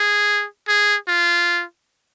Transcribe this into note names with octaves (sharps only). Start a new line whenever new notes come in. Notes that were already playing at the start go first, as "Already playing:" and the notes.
Already playing: G#4
G#4
F4